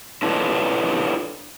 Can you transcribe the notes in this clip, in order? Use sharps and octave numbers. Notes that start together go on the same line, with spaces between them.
D4 E4 F4 A4 B4 C#5